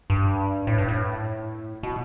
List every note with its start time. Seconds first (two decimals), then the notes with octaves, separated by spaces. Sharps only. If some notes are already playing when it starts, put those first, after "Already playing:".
0.10 G2
0.67 A2
0.78 G2
0.88 A2
1.83 B2